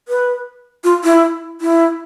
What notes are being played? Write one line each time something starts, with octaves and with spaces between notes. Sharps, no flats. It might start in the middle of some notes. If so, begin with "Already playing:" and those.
B4
F4
E4
E4